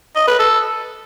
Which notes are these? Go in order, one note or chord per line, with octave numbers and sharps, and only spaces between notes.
D#5
B4
A4